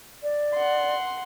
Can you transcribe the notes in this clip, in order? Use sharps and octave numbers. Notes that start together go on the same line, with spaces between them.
D5
F#5 C6